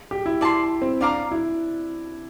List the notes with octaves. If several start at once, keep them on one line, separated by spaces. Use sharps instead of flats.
G4
E4
E4 D5 A5 C6
C4
D4 D5 F5 A#5 D6
E4